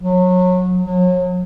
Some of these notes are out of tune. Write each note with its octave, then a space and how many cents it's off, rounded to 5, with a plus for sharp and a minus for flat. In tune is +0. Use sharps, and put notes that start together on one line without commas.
F#3 -25
F#3 -35